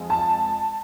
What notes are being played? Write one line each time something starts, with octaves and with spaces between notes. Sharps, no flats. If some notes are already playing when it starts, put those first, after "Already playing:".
Already playing: F2 F3 G#3
A5